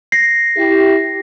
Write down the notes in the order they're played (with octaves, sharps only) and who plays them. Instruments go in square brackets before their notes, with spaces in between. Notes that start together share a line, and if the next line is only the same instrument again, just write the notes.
[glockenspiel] A#6 C7
[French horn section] E4 G4